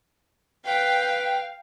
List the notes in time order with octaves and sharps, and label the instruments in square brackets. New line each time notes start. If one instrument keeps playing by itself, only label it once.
[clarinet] B4 [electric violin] F5 [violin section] G5